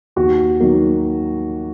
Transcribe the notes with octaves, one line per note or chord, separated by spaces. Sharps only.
D#2 F#4
D#3 F#3 A#3